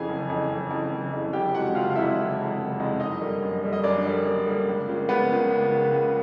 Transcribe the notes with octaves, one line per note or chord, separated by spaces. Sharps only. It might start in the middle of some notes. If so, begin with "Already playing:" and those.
Already playing: F2 C#3 E3 G#4 G#5
F#1
F2 C#3 E3
F#1
F2 C#3 E3
F#1
F2 C#3 E3
F#1 G4 G5
F2 C3 E3 G#3 F#4 F#5
F#1 F4 F5
F5
F2 C3 E3 G#3 E4 E5
F#1
F2 C3 E3 G#3
F#1
F2 C3 E3 G#3
F#2 D#4 D#5
D3 G3 A#3
F#2
D3 G3 A#3
D#5
F#2 D4 D5
D3 G3 A#3
F#2
D3 G3 A#3
C#2
C#3 F3 A#3
C#2 B3 B4
C#3 F3 A#3
C#2
C#3 F3 A#3
C#2